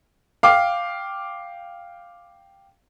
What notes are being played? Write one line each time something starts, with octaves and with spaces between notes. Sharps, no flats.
F5 G5 D6